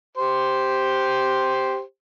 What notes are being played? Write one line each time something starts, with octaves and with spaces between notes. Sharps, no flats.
G4 C5